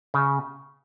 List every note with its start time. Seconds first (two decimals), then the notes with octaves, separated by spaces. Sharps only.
0.14 C#3